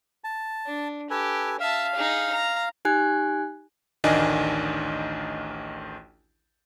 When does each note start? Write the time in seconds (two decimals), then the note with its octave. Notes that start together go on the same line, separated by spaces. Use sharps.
0.24 A5
0.66 D4
1.10 G4 A4 B4 G#5
1.60 E5 F5 A5
1.95 D#4 G#4
2.32 A#5
2.85 D#4 G4 G#5 F#6 G#6
4.04 A1 D2 D#3 D4 D#5 G#5